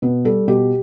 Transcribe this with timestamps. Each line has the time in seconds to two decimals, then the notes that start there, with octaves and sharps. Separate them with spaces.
0.02 B2 B3
0.25 G3 A4
0.48 B2 G4